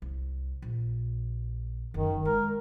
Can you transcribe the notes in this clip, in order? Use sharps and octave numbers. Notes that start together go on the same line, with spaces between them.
C2
A#1
F#1 D#3
G#3 A#4